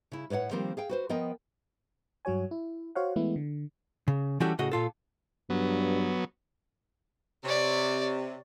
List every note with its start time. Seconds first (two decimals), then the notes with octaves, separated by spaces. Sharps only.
0.12 C#3 E4
0.30 A2 B4 C#5 D#5 F#5
0.51 D#3 F3 G3 A#3 C4 A#4
0.77 G#4 F5 G5
0.89 F#4 B4 C5
1.09 F3 B3 A#4 D#5 G5
2.25 G2 F#3 F#4 C#5 G#5
2.51 E4
2.95 F#4 C5 C#5 F5 F#5
3.16 E3 G#3 A3 B3 E4
3.36 D3
4.08 C#3
4.40 E3 G3 C#4 F#4 G4 A4
4.59 A2 C#3 F#4 D#5
4.72 A#2 F4 A4
5.50 G2 F#3 B3
7.44 C3 C#5 D5